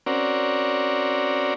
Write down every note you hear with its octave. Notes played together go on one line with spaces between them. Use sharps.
C4 C#4 F#4 A#4 D5